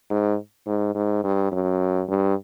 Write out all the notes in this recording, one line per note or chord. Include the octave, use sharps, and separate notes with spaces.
G#2
G#2
G#2
G2
F#2
G2